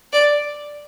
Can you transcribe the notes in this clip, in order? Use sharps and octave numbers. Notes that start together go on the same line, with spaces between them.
D5